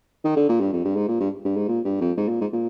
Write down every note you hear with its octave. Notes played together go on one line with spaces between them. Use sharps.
D#3
D3
A#2
G2
F2
G2
G#2
A#2
G2
G2
G#2
A#2
G2
F2
G#2
A#2
G#2
A#2